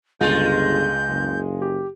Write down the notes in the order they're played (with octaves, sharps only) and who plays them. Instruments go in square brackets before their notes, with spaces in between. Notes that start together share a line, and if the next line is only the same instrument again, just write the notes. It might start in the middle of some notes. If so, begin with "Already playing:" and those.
[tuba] G1 [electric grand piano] C#2 [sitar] G#3 F4 [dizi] G6
[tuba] F#1
[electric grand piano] G4